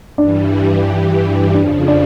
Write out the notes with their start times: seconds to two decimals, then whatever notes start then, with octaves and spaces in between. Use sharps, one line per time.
0.18 G2 E3 G3 D4 D5
1.54 F2 C#3 F3 D4 D5
1.88 D4 D5